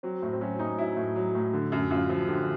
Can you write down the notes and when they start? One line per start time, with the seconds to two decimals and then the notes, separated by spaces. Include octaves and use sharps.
0.03 F#3 C4
0.22 A2
0.33 C4
0.41 F#3 C#4
0.59 A2 D#4
0.78 F#3 E4
0.97 A2
1.16 F#3
1.35 A2
1.53 D3
1.72 F#2
1.91 F#2 F4
2.10 F3
2.28 D3 G4